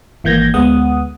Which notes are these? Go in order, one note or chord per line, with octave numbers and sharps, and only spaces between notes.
G#1 E3 A#3 G6 G#6 A#6
D2 G#3 B3 F#5 D#6